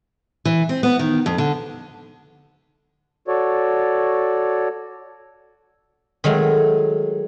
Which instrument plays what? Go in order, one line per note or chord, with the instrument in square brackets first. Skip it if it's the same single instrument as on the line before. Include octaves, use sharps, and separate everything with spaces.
[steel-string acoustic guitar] E3
C4
B3
D#3
F2
D3
[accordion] F#4 A4 C#5 D5
[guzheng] D#3 F#3 G#3 A3